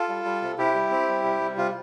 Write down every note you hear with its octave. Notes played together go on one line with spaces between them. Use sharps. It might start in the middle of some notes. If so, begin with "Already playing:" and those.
Already playing: F4 A4
G3
G3
C3
C3 E4 G4
G3
C4
G3
C3
G3
C3 F4